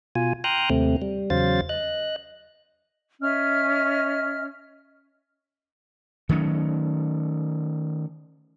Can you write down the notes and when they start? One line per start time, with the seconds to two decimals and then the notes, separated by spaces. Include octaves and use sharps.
0.15 B2 F4 G#5
0.44 G5 A#5 C6 D#6 F6 F#6
0.70 D#2 C3 A3 C4
1.02 G3
1.30 E2 C#3 F#3 C5 F5 A6
1.69 D#5 F#6
3.21 C#4 D#5 E5 F6
6.29 D#3 F#3 A3 C#4